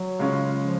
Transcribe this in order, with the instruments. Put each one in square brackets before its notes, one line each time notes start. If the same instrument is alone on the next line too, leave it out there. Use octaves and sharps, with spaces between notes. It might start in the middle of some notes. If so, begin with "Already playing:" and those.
Already playing: [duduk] F#3
[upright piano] C#3 G#3 C#4 F4
[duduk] F3